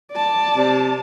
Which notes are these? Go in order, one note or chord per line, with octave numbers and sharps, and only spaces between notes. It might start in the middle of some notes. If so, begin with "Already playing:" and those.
D5 A5
C3